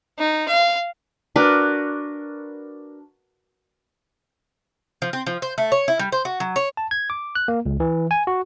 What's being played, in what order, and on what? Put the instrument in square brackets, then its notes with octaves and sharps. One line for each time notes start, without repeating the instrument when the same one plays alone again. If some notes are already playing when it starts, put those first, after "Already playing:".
[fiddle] D#4
F5
[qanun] D4 F#4 A#4 B4
[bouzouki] F3
C4
F3
C5
A3
C#5
E4
G3
C5
F#4
F#3
C#5
[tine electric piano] A5
G#6
D6
F#6
A#3
C#2
E3
G#5
F#4